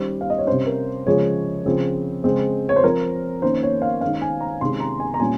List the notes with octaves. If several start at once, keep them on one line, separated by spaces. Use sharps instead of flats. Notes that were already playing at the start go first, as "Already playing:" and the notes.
Already playing: D#3 G3 C#4 C5
F5
D#5
C#5
C3 G3 C#4 C5
A#4
C#3 F3 G#3 C#5
C#3 F3 C4
C#3 G#3 C4
C#5
C5
F3 C4 A#4
D#3 A#3 C#4 C5
C#5
F5
D#3 G#3 C#4 F5
G#5
A#5
C3 D#3 G#3 C#4 C6
A#5
G#5
A#5
A#2 G3 C#4 G#5